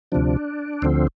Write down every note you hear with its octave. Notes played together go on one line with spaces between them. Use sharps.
D2 C3 F3 D4
D2 D3 F3 C4